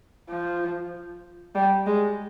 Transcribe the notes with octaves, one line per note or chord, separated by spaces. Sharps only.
F3
G3
G#3